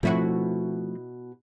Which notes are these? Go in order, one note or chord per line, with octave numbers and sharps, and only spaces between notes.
B2 F3 A3 C4 E4 F#4